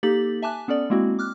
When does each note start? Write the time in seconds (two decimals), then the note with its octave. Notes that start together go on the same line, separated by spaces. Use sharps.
0.03 A#3 D#4 G4 A4 A6 F#7
0.42 E5 G#5 A5 D6 F#6
0.68 B3 C#4 A4 D5
0.90 G#3 A#3 C4 E4 F#4
1.19 D6 F6 F#6